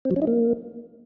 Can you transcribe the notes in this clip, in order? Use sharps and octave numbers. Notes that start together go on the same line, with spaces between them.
C4
F#3
C#4
D#4
A#3